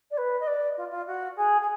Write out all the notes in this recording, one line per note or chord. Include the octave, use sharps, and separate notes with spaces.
D5
B4
D#5
D5
F4
F4
F#4
G#4
G#4